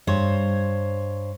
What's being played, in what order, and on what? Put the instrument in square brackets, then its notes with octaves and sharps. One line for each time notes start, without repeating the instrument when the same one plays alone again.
[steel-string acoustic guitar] G2 C5 C#5